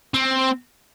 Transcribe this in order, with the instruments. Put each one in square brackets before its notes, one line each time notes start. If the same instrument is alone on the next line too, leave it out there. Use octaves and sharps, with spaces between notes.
[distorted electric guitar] C4